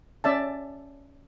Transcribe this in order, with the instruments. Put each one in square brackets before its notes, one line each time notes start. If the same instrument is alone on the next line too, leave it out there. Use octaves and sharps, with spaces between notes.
[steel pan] C#4 D5 E5 A5